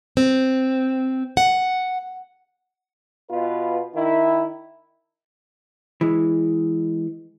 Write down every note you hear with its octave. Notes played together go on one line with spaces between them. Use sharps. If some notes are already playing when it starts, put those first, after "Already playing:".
C4
F#5
B2 F4 B4
D#3 E4
E3 G#3